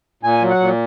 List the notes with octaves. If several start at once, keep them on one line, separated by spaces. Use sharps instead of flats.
A#2 G#5
F#3
F#5
A#2